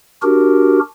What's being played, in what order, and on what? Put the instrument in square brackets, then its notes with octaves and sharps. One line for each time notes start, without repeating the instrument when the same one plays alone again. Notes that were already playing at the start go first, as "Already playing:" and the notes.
[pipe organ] D4 F#4 G4 A#4